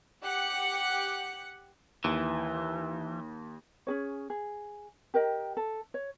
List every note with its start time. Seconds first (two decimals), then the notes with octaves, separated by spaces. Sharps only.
0.23 G4 F#5 F#6 C#7
2.04 D#2 E3
3.87 C#4 G#4 C#5
4.30 G#4
5.14 G4 A#4 D#5 G5
5.57 A4
5.94 C#5